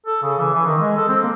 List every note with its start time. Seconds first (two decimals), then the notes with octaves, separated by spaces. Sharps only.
0.06 A4
0.22 C#3
0.38 E3
0.54 E3
0.66 D#3
0.79 G#3
0.97 A4
1.08 C4
1.22 A#3